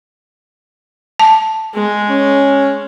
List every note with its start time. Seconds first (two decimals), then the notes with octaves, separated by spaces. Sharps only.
1.20 A5
1.74 G#3
2.09 C#4